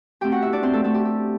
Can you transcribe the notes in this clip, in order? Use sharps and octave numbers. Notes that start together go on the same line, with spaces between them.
B2 A3 C4 G4 G5
F#4 F#5
E4 E5
D4 D5
C4 C5
A3 A4
A3 A4
G4
G4